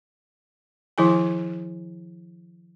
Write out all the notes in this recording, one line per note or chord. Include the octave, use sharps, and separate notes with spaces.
D#3 F3 E4 G#4 G#5